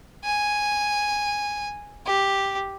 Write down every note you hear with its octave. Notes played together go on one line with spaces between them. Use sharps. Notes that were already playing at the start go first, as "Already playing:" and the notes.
G#5
G4